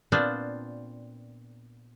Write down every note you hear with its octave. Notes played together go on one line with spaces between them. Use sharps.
A#2 B3 C4 D4 F4 C5